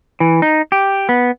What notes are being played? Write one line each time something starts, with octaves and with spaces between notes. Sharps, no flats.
E3
D#4
G4
B3